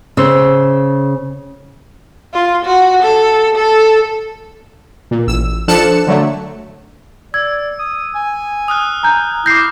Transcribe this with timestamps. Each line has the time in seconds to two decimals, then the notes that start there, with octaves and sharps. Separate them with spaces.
0.17 C#3 C5 E6
2.34 F4
2.65 F#4
3.03 A4
3.56 A4
5.11 A#2
5.27 A1 E6
5.68 F3 D4 A4 F#6 C#7 E7
6.07 D3 F#3 A3
7.34 D5 E6 G#6
7.79 D#6
8.15 G#5
8.68 D#6 F6 F#6
9.03 G#5 A#5 G6
9.46 E4 D6 F6 G6 A#6 C7